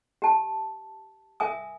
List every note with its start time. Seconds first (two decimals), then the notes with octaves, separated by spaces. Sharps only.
0.22 G4 A5
1.40 A#4 E5 G#5 D#6